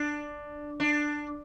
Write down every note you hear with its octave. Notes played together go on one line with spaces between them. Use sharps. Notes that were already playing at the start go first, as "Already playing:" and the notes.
Already playing: D4
D4